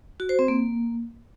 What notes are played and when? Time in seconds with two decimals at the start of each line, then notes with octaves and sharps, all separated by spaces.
0.20 F#4
0.29 C5
0.39 C4
0.48 A#3